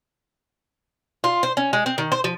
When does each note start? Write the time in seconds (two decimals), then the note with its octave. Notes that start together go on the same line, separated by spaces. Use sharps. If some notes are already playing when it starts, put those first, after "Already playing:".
1.24 F4
1.43 C5
1.57 C#4
1.73 G#3
1.86 C4
1.98 D#3
2.12 C5
2.24 F3